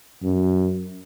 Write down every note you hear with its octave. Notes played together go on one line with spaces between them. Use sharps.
F#2